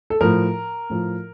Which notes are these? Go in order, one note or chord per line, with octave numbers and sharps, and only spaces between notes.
A4
A2 F3 A#4
A2 F3